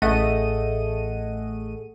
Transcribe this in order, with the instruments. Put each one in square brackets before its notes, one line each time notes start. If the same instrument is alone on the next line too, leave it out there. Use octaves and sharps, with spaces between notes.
[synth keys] A1 A3 G#4 D#5 F#5 D#7